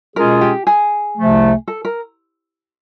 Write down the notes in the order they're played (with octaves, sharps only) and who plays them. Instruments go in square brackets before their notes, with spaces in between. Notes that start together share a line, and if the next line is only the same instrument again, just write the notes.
[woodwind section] B2 G#3 C#4 F4 G#4 [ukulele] A#4
[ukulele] G4
G#4
[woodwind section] C2 C3 F3 A3
[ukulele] A4
A#4